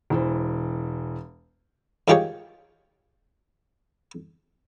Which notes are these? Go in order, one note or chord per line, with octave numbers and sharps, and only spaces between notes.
E1 E3 C5
G#2 D#3 F4 G4 G#4 C#5